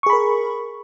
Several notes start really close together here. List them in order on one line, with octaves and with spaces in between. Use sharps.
C#6 G#4 B5 A#4